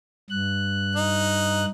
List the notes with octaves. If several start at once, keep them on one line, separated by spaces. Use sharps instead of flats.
G2 F#6
D#4